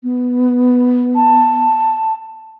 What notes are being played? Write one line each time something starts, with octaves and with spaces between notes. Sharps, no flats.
B3
A5